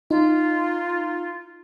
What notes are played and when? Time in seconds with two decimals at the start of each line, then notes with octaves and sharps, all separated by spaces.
0.11 D#4 F4